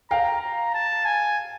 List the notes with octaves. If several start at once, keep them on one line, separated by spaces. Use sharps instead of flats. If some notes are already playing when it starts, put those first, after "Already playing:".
F5 G5 A#5
A#5
A5
G#5